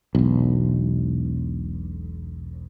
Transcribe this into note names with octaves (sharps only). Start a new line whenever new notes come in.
E1 B1